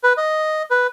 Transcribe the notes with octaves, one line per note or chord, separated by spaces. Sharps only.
B4
D#5
B4